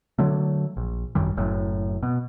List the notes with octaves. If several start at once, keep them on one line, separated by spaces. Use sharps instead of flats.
D3 F#3 A3
A#1
G#1 F#2 D#3 G3
F#1 F#2 A2
B2